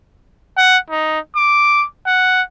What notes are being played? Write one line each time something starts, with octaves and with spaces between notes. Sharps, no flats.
F#5
D#4
D6
F#5